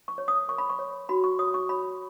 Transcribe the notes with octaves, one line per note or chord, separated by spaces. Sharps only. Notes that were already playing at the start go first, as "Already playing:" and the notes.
C#6
C#5
D#6
A#4 C#6
B5
C#6
C#5
F#4 B5
C#6
C#5 D#6
C#6
C#5 B5